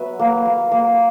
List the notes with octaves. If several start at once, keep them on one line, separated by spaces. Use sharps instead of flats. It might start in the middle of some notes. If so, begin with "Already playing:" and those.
Already playing: F#3 B3 B4 E5
A#3
A#3
A#3